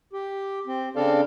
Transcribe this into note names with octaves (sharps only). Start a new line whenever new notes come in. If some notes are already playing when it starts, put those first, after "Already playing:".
G4
C4
C#3 C4 D4 A4 D5 F5